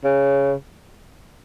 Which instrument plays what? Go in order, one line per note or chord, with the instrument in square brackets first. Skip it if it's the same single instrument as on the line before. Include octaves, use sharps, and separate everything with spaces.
[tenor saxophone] C#3